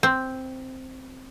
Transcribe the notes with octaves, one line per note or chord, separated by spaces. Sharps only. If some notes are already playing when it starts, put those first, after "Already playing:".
C4